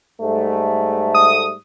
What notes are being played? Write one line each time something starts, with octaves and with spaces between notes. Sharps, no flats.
G#2 G3 A3
D#6